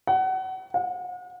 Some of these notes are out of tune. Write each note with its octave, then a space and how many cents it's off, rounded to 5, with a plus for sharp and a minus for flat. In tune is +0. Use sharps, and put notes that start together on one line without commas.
F#5 +30
F#5 -40